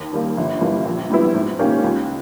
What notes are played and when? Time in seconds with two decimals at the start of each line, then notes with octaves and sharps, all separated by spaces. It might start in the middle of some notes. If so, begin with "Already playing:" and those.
Already playing: D#2
0.13 D#3 G3 A#3
0.37 G1
0.61 G2 E3 G3 A#3
0.85 A#1
1.10 G#2 G3 B3 E4
1.34 G#2
1.59 D#3 A#3 C#4 G4
1.84 C#2